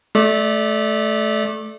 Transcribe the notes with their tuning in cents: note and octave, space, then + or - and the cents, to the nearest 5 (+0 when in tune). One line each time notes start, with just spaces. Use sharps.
A3 -20 D5 +10